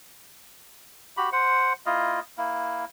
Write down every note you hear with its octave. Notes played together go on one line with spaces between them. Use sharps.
F#4 G4 B5
C5 F#5
A#3 E4 F4 D#5
A#3 E4